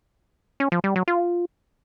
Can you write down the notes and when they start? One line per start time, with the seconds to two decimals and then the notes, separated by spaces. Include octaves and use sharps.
0.60 C#4
0.72 F3
0.84 G3
0.96 F#3
1.08 F4